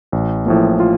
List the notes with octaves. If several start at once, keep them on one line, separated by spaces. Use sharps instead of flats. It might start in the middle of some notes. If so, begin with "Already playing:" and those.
A1
A2 F3 A#3
F4